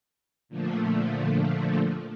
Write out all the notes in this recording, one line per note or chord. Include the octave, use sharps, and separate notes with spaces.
A#2 D3 F3 A3